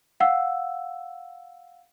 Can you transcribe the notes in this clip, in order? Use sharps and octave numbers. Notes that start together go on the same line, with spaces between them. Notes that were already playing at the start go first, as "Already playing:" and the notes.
F5 F#5 E6